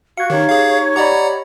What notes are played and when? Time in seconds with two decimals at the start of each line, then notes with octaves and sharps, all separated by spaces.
0.17 F#4 F5 G#6 C#7
0.30 D#3 D#4 G4 C#5
0.49 G#4 F5
0.96 G4 D5 D#5 F#5 A#5 B5